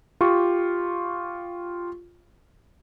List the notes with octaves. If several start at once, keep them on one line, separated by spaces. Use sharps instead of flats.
F4 G4 C#6